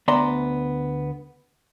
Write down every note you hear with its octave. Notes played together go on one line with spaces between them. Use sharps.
D2 B3 D5 E5 A#5 C6